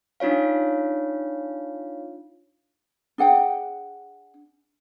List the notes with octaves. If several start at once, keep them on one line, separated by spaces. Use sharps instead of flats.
D4 D#4 F4 C#5 F5
D4 G#4 F#5 G5